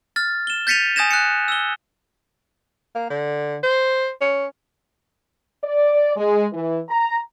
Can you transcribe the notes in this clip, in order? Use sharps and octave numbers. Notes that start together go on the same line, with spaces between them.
F6 A6
E7 G7
G6 A6 B6 C#7 D#7 F7
G#5 D#6 G6 G#6 A#6 E7
F#6 C#7
E6 G7
A#3
D3
C5
C#4
D5
G#3
E3
A#5